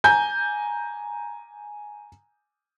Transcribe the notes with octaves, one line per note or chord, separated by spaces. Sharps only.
G#5 A#5 G6